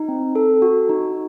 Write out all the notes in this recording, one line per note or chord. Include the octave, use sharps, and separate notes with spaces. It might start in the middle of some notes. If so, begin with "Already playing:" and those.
Already playing: D#4
C4
A4
F#4
D#4